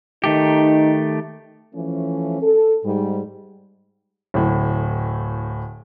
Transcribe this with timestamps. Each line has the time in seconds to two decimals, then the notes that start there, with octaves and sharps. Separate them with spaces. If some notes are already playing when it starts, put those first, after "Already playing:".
0.24 D#3 A3 D#4 G4
1.74 E3 F3 A3 C#4
2.42 A4
2.84 G#2 G3
4.34 D1 A2